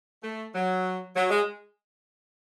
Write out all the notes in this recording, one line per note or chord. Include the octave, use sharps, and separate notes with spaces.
A3
F#3
F#3
G#3